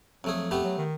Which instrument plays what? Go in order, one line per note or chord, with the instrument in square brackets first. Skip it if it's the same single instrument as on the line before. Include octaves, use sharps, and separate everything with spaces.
[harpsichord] F2 A3 G#4 [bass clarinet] F#3
[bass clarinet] F2 [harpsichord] A3 B3 G4
[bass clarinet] F#3
D#3